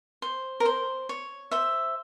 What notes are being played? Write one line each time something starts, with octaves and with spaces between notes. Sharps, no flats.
C5
A#4
C5
C#5
C5 E5